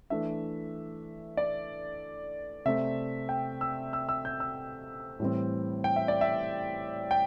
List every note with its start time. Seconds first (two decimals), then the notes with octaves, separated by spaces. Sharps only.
0.10 E3 A3 D4 E5
1.37 D5
2.65 C3 A3 C4 E5
3.29 G5
3.61 E6
3.93 E6
4.09 E6
4.25 G6
4.40 E6
5.20 A2 E3 G3 C4
5.84 G5
5.96 E5
6.08 D5
6.21 E5
7.11 G5